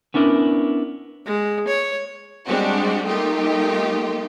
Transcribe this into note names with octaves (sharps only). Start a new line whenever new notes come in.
B3 C#4 D4 E4 A#4
G#3
C#5
G3 G#3 C4 D4 F#4 G4
G3 A3 A#3 D#4 F4 G4